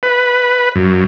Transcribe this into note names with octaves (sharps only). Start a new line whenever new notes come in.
B4
F#2